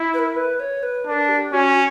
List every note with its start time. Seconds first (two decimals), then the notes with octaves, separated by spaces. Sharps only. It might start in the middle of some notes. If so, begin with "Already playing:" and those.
Already playing: E4
0.14 B4
0.19 A#4
0.36 B4
0.60 C#5
0.83 B4
1.06 D4 B4
1.11 A#4
1.29 G4
1.52 C#4 F#4